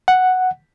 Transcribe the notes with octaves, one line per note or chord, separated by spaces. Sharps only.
F#5